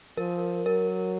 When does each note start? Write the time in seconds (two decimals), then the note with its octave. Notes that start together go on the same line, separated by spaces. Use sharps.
0.17 F3 A#4
0.65 F#3 A#4